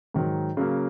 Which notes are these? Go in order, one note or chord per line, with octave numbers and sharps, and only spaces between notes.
G#2 D#3 F#3
C#3 F#3 A#3